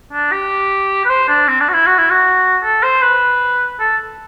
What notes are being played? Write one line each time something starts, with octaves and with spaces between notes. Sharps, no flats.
D4
G4
B4
C5
D4
C4
D4
F#4
E4
F#4
E4
F#4
A4
C5
B4
A4